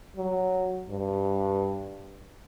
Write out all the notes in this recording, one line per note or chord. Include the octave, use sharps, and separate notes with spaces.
F#3
G2